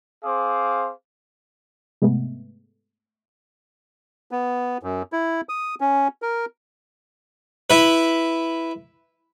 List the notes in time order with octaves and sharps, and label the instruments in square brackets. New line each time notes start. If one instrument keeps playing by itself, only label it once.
[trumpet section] C4 G#4 C5 F5 D6
[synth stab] G#2 C3 G#3 A3 B3
[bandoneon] B3
F#2
E4
D#6
C#4
A#4
[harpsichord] E4 B4